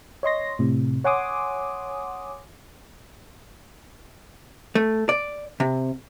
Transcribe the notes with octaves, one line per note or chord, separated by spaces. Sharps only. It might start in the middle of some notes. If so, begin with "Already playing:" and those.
C#5 D#5 C6 A#6
A2 C3
C#5 F#5 G#5 C6 D6 D#6
A3
D5
C3